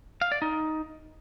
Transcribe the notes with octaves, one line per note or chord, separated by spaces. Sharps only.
F5
D5
D#4